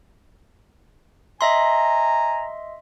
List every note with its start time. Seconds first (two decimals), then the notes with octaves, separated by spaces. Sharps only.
1.41 D#5 E5 G#5 A#5 C6